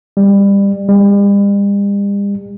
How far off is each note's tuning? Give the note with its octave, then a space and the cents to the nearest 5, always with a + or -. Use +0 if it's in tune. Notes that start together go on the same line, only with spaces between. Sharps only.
G3 +25
G3 +45